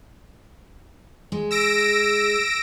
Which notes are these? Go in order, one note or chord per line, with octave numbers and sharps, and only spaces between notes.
G#3
E6 A#6 D7